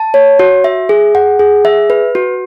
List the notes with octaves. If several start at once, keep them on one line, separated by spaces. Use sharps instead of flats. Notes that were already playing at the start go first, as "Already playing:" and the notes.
Already playing: A5
C#5
F#4
E5
G#4
F#5
G#4
E5
B4
F#4